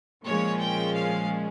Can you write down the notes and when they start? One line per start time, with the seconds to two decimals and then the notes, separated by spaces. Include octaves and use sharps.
0.24 A#2 F3 G#3 C#4 C#5
0.59 G5
0.94 F5